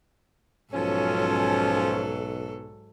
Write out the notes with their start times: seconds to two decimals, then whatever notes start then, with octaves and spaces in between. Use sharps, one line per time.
0.73 B1 G#2 F3 F#3 C#4 A4